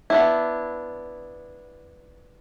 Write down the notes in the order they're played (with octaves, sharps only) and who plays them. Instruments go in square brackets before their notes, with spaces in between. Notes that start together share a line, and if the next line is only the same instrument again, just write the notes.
[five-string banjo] B3 D4 E4